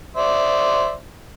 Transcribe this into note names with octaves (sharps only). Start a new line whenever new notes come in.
C5 D5 E5